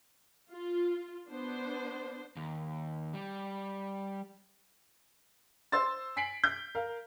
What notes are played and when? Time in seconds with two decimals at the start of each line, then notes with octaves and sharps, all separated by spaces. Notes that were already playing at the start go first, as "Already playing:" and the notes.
0.50 F4
1.29 B3 D4 C5
2.36 D#2
3.14 G3
5.72 C5 C6 E6 A6
6.16 G#5 B6 C7 D7 F#7
6.44 G6
6.75 A#4 F5